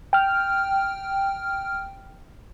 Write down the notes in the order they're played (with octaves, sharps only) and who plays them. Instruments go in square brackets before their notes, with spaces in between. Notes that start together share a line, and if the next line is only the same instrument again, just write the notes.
[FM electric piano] G5 F6